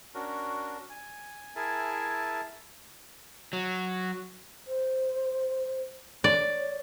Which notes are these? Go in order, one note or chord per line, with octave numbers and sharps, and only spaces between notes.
C#4 D4 F#4 A#4
G#5
E4 G#4 A#4 E5 G#5 A5
F#3
C5
C#5 D5